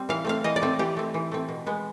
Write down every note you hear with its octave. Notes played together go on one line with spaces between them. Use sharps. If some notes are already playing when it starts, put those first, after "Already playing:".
Already playing: G3 C4
E3 F5
A3 C4 F5
E3 D#5
D5
A3 C4
E3 G4
A3 C4
E3
A3 C4
B2
G#3 B3